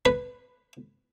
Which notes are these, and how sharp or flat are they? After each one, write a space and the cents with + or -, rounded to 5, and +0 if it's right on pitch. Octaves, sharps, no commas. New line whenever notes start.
B4 +5